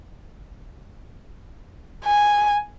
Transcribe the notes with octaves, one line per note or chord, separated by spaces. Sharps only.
G#5